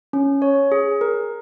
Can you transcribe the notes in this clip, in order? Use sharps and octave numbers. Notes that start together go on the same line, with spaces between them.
C#4
C#5
G#4
A#4